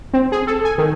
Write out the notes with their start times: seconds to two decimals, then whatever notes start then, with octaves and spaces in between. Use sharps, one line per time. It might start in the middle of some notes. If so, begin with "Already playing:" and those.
0.14 C4
0.32 G#4
0.47 A4
0.65 G#5
0.78 D#3